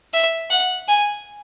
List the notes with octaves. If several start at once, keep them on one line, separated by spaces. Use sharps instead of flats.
E5
F#5
G#5